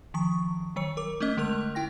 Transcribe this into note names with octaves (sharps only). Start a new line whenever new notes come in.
D#3 F3 C#6
D#3 F#3 C#5 C#7
A#4 D6
A3 A#3 C#4 D#5
D3 G#3 A3 A#4 F6 F7
E4 G5 A#6